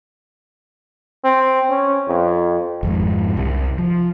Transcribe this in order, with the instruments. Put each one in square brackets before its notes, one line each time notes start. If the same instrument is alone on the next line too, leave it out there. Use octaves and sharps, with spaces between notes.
[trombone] C4
C#4
F2
[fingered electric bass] G#1 F2 G#2
C2
F3